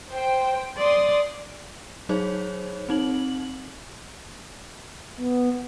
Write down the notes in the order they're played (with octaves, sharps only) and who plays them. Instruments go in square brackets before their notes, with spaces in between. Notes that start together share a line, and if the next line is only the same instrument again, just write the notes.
[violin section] C5 G5
[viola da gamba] D5 [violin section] C6 D#6
[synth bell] F#3 D#4 G#4 C5 C#5
C4 D#4 F#7
[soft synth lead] B3